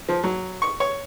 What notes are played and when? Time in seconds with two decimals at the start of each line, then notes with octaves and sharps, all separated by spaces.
0.09 F3
0.24 F#3
0.62 C#6
0.80 C#5